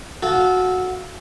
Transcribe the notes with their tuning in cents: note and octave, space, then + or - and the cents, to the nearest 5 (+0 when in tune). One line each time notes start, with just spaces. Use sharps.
F#4 -10 A4 -20 F5 -20